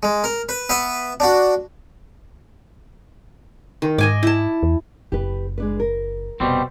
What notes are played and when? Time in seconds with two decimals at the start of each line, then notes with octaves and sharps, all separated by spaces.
0.03 G#3
0.24 A#4
0.49 B4
0.69 B3 B4 E5
1.20 D4 F#4
3.82 D#3
3.98 G#2 D#5 G#5 D6
4.23 E4 A5
4.63 E2
5.12 F#1 E4 G4 B4
5.58 G#3 D4 B4
5.80 A#4
6.40 F1 B2 G3 C4